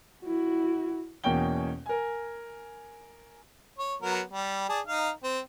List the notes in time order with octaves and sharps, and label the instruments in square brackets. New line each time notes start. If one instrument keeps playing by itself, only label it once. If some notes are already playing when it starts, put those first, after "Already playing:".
[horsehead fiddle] E4 F#4
[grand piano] E2 B2 A#3 C#4 G5 G7
A#4 G#5
[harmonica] C#5
F#3 B3 A#4
G3
G#4 D5 A5
D#4 F5
C4